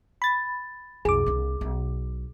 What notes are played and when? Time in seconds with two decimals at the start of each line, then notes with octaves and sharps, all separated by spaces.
0.22 B5 A6
1.05 B1 F2 G#4 D6
1.26 C2 D3
1.61 B1